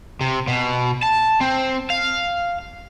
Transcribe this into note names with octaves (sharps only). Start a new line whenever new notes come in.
C3
B2
A5
C4
F5